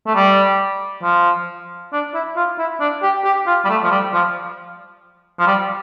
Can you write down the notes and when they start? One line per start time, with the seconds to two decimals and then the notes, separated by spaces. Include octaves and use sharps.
0.07 A3
0.15 G3
1.03 F3
1.92 D4
2.14 E4
2.37 F4
2.59 E4
2.80 D4
3.03 G4
3.25 G4
3.47 F4
3.65 G3
3.70 A3
3.84 F3
3.91 G3
4.14 F3
5.40 F3
5.47 G3